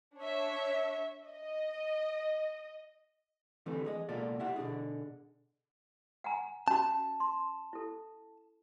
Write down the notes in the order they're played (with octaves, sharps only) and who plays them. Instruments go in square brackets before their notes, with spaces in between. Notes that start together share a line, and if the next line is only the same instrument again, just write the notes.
[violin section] D4 C#5 E5
D#5
[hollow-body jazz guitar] D3 E3 G3 A3 C4 B4
G#4 D#5
C#2 B2 A#3 F4 A4 D5
E4 G4 E5 F#5
B2 D3 D4 G#4
[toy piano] F#5 G#5 A#5
[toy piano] C#4 F#4 [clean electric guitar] A5
[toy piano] C6
E4 A4